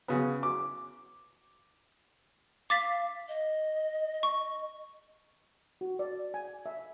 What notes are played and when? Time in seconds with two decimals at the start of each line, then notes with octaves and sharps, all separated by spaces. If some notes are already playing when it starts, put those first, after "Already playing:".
0.08 C#3 B3
0.43 D6
2.70 F5 D6 A6 B6
3.28 D#5
4.23 C#6
5.81 F#4
5.99 D5
6.34 G#5
6.66 E5